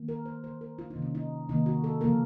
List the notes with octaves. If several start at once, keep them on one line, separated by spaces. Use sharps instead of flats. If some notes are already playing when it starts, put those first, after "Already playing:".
Already playing: D#3 A#3
A#4
C5
D#3 A#3 C5
A#4
F4
D#4
C3 D#3 A#3
C#4
D#4
C3 D#3 A#3 D#4
F#4
A4
C#3 F3 A#3 A#4